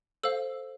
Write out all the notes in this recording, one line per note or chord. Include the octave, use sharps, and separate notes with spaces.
A4 C5 F5 E6